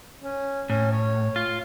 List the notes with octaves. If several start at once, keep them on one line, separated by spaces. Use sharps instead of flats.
C#4
A2 C#4
C#5
F4